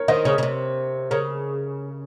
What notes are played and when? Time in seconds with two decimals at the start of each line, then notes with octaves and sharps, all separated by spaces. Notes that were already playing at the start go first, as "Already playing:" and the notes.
Already playing: A#4 C#5
0.08 D#3 C5 D#5
0.25 C#3 A#4 C#5
0.38 C#3
0.43 C3
1.11 C#3 A#4 C#5